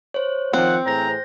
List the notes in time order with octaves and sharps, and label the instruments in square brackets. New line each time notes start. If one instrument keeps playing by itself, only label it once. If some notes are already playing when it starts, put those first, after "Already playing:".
[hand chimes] C5 C#5
[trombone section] D#3 F3 [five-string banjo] C4 [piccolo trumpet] F#5
[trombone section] A2 E3 G#4 [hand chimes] C5 G6 A#6 [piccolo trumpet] A#5